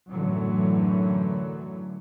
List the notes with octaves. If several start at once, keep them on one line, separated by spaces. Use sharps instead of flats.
F#2 A2 D3 E3 F#3